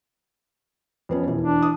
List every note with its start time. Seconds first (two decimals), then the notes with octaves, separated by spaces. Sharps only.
1.09 F2 B3 C#4
1.27 E1 E3
1.42 D4
1.62 D#6